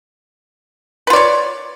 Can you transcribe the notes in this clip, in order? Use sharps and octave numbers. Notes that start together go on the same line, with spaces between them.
F4 B4 C#5 D5